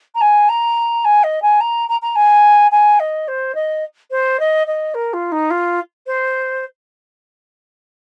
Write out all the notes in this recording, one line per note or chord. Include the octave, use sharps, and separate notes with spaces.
A#5
G#5
A#5
G#5
D#5
G#5
A#5
A#5
A#5
G#5
G#5
D#5
C5
D#5
C5
D#5
D#5
A#4
F4
D#4
F4
C5